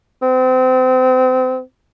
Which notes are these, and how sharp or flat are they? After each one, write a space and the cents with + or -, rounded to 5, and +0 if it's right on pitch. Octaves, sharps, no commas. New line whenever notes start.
C4 -30